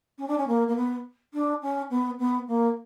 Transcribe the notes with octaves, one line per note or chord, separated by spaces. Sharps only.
C#4
D4
C#4
A#3
A#3
B3
D4
C#4
B3
B3
A#3